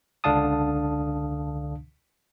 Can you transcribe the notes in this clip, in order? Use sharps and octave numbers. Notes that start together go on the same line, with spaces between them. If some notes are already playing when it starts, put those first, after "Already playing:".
C#2 D3 D4 F5 A5 D#6